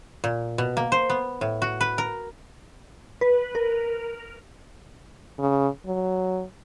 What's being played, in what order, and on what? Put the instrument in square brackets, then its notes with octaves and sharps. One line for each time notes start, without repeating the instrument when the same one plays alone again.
[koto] A#2
B2
A#3
C5
B3
A2
F#4
B4
A#4
[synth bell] B4
A#4
[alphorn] C#3
F#3